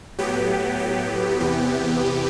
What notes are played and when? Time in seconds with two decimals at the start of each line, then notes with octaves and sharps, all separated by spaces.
0.19 A2 F#3 B3 G4
0.79 G4
1.40 E2 C3 E3 B3